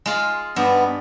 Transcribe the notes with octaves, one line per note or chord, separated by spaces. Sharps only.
G#3 F4
G2 B3